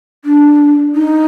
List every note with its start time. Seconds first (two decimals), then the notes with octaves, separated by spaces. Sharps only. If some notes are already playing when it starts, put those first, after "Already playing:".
0.25 D4
0.95 D#4